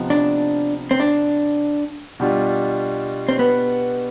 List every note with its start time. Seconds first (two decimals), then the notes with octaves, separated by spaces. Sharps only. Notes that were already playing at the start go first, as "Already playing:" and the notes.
Already playing: C3 F3 B3 D#4
0.10 D4
0.91 C4
1.00 D4
2.20 B2 G3 D4 F4
3.29 C4
3.39 B3